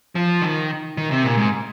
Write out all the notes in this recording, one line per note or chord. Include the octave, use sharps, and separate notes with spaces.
F3
D#3
D#3
C3
A#2
G#2